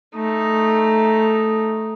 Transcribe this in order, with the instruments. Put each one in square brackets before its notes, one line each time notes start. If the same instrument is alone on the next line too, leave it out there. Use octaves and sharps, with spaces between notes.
[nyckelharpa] A3 D#4